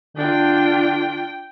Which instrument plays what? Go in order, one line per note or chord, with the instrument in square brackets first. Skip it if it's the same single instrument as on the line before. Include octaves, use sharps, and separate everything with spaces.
[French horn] D3 [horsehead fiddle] D4 F4 [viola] G5